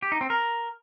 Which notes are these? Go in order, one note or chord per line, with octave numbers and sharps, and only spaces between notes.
G4
D#4
C4
A#4